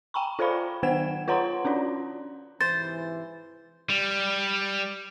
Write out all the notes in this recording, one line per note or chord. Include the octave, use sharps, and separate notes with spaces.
G5 G#5 A#5 B5 C#6
F4 A4 C5 D5 F5 B5
D#3 B3 C5 F#5 G#6 E7
F4 B4 C#5 F#5 A#5 C6
C#4 D4 F#4 D5
G#2 C3 E3 C5 A6
G3